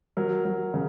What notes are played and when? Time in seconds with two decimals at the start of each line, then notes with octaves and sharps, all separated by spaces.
0.17 F#3 A#4
0.45 F#3
0.74 C#3